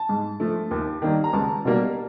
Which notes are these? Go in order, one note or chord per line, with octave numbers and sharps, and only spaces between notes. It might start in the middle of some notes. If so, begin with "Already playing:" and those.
Already playing: A5
G#2
F3 A3
D#2
D#3 G3 A#3
A#5
C#2 A5
B2 G3 A#3